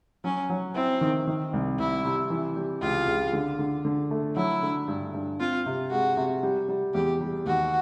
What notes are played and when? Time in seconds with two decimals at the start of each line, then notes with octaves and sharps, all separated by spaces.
0.24 F#3 C#4
0.50 F#3
0.75 C4 E4
1.01 D#3
1.27 D#3
1.53 C2
1.79 C2 E4
2.04 C3
2.30 E3
2.56 G3
2.82 C#2 F4
3.08 C#2
3.33 D3
3.59 D3
3.85 D3
4.11 A3
4.36 F#3 E4
4.63 D3
4.88 G2
5.14 G2
5.40 C4 F4
5.66 C3
5.91 G#3 F#4
6.17 C3
6.43 G3
6.68 G3
6.94 E2 G4
7.20 G3
7.46 D#2 F#4